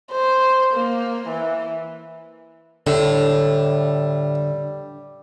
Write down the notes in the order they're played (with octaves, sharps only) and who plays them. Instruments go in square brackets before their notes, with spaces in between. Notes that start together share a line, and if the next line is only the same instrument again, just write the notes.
[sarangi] C5
A#3
E3
[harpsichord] A2 [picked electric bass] D3 [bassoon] G3